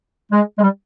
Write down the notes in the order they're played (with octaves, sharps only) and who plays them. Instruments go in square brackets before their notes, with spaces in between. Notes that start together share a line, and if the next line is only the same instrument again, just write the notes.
[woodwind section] G#3
G#3
G3